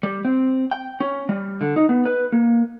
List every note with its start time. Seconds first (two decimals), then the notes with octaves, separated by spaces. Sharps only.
0.03 G3
0.25 C4
0.71 G5
1.00 C#4
1.29 G3
1.61 D3
1.76 D#4
1.89 B3
2.06 B4
2.32 A#3